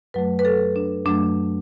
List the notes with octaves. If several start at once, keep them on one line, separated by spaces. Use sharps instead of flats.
F#2 F#3 A3 B4
B4
A4
D4
F#2 F#3 A3 D4